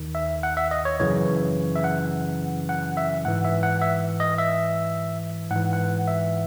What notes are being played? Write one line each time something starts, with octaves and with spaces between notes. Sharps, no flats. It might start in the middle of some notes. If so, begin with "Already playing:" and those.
Already playing: D#2 D#3
E5
F#5
E5
D#5
C#5
F#2 C#3 E3 C#5
E5
F#5
F#5
E5
G#2 E3 F#5
E5
F#5
E5
D#5
E5
G#2 F#5
E3
F#5
E5